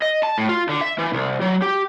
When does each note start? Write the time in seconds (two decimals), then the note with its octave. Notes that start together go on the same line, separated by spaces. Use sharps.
0.02 D#5
0.23 A5
0.38 A2
0.49 F4
0.69 D3
0.81 E5
0.99 E3
1.14 C2
1.41 F#3
1.62 G4